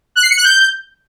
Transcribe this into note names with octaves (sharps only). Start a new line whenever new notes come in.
F#6
C7
C#7
F#6
G6